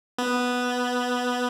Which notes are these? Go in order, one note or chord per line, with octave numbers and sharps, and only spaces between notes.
B3